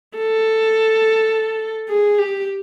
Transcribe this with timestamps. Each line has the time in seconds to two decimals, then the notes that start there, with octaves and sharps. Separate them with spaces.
0.17 A4
1.89 G#4
2.18 G4